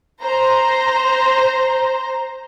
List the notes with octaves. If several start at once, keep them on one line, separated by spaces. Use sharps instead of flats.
C5 A#5